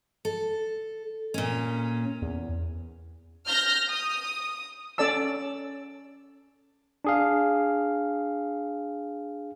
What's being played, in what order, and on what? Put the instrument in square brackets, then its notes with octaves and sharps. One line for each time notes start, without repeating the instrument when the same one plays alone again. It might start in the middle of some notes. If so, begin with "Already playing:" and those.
[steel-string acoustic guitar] A4
A#2 C#4
[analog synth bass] E2
[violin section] F6 G6 A#6
D#6
[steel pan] C#4 A4 D5 A5 E6
[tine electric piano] D4 G#4 F5